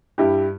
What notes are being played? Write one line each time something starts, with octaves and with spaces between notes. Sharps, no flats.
G2 G3 E4 G4